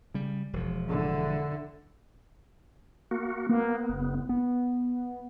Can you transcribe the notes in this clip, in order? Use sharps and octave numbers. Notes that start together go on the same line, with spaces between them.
C#3 G3
E1 F3
D3 E4
A#3 F#4
A#3 B3
F#1
B3